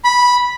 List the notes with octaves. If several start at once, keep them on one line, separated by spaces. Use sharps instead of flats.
B5